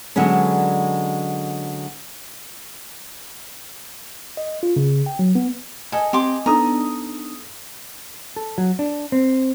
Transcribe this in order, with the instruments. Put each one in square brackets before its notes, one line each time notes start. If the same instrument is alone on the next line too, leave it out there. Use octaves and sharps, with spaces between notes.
[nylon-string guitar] D3 F#3 G#3 B3 C#4
[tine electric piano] D#5
F4
C#3
G5
F#3
B3
[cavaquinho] A4 [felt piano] D#5 G#5
[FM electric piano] C4 [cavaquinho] G4 C6 D6
[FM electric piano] B3 D4 D#4 [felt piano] A4 D#6 [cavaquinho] A#5
[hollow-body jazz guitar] A4
F#3
D4
C4